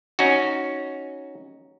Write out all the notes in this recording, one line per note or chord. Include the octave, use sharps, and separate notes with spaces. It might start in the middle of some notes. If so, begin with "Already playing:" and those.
C#4 D#4 F#4